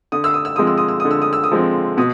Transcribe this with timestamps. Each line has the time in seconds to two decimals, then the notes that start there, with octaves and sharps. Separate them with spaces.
0.12 D3 D#6
0.24 E6
0.34 D#6
0.45 E6
0.56 F3 G#3 C4 D#6
0.67 E6
0.78 D#6
0.88 E6
1.00 D3 D#6
1.11 E6
1.22 D#6
1.33 E6
1.44 D#6
1.51 F3 G#3 C4
1.97 B2 D#6